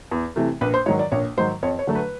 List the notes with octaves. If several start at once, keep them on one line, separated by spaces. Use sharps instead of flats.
E2
C3 E3 A3
A#1 B4
C5
G#2 D#3 F#3 C#5
D5
A#1 C#5
G#2 D#3 F#3 C5
F2 C#5
C#5
D3 F#3 A3
B4